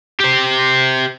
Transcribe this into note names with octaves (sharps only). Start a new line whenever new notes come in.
G4 C5